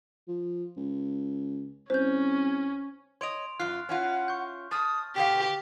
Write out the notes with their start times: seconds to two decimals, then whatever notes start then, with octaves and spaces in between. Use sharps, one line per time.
0.28 F3
0.77 C#2
1.90 C2 C#4 C5 G6
3.21 C#5 D#5 C6 D7 F7
3.59 F#2 F4 F6 F#6 C7
3.89 C#4 E4 F4 F#5
4.28 C#6 G6
4.71 A5 D#6 F6 A6
5.16 B2 D3 G4 F5 G5 B6